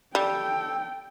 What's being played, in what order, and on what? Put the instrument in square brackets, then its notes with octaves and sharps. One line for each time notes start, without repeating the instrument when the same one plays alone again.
[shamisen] G3 [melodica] A4 [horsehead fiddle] G5